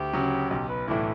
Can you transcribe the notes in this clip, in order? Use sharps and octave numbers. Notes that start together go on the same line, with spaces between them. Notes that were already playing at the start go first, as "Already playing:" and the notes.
Already playing: D2 G4
C#3 F#3 C#4
B1 G4
B4
A2 E3 A3 D4 E4